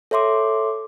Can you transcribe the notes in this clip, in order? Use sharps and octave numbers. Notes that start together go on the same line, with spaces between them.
A4 C#5 E5 C6 D6